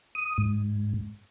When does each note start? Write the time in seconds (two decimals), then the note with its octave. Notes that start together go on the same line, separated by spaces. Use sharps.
0.15 D#6
0.38 G#2